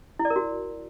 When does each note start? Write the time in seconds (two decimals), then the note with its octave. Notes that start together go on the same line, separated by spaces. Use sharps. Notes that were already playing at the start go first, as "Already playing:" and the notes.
0.19 E4
0.25 D5
0.30 A#4
0.36 F#4